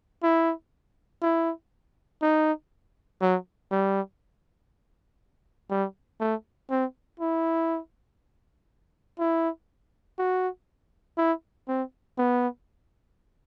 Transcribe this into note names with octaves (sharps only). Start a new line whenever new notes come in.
E4
E4
D#4
F#3
G3
G3
A3
C4
E4
E4
F#4
E4
C4
B3